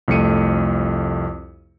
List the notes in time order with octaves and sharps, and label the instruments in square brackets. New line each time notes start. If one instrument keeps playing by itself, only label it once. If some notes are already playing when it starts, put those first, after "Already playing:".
[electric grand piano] C2 F2 A3 C#7 D#7